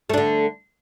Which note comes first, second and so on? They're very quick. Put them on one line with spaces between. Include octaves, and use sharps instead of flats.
A3 D4 D3